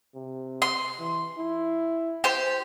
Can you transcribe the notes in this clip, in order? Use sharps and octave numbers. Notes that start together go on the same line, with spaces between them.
C3
C6
E3
E4
G4 C5